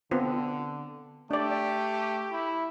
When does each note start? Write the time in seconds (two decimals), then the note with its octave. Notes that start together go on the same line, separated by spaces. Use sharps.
0.11 D3 B3 C4 F4
1.31 A3 D4 G4 D5
2.32 E4